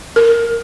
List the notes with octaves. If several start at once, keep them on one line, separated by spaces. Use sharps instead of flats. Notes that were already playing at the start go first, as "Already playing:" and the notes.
A#4